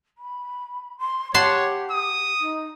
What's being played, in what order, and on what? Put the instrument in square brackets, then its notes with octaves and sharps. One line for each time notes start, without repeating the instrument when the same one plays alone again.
[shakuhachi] B5
C6
[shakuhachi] G4 [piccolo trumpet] C#5 [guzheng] F#5 A5 C6
[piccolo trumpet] D#6
[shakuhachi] D#4